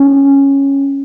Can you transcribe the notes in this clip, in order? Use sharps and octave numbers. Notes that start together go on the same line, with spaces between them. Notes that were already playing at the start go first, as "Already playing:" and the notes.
Already playing: C#4